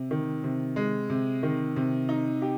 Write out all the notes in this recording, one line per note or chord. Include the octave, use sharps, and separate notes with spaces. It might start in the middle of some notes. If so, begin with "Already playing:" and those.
Already playing: C3
D#3
C3
G#3
C3
D#3
C3
D#4
G4